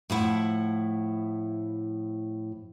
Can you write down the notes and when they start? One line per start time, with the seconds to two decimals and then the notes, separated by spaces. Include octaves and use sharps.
0.10 A2 F3 E4 F#5